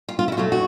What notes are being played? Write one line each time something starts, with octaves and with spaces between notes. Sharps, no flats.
F4
F4
E4
F#4
B2 F#3 A3 F4
F#4